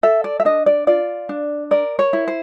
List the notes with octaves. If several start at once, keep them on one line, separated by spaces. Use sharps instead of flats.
A4 E5
D5
E5
D4 D#5
D5
F4 D5
D4
A#4 D5
C#5
E4
C5